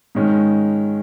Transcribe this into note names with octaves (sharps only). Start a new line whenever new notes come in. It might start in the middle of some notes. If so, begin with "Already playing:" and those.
G#2 D#3 G#3 C#4